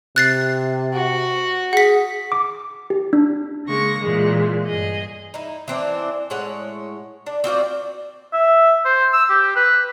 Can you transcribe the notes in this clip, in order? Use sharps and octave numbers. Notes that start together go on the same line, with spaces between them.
C3 F#6 A6 C7
F#4
G#4 F#5 B6
D6
G4
D4
C#3 G#3 A#3 C#6 A#6
A#2 E3 G#3
G2 G#4 D#5
D#4 E4
E3 C4 D4
A2 G#3 C#5 F#5
D4
C4 F4 F#4 D5
E5
C5
E6
G4
B4